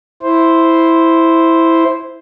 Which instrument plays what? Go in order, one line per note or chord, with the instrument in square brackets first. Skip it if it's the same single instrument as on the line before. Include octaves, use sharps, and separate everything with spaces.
[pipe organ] E4 C5